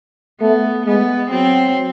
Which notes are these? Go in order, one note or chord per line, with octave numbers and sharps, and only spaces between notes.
A3 B3
G#3 B3
F#3 C4